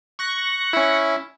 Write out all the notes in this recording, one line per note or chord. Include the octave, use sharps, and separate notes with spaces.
C#6 F#6 A#6
C#4 E4